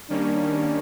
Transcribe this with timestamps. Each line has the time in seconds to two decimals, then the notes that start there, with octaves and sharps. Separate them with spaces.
0.10 D#3 G3 A#3 C#4 D4